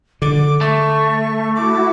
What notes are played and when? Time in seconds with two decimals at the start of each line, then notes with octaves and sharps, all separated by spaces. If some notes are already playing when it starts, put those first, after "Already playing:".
0.22 D3 D6
0.61 A3 C#6
1.55 E4 F#4 D6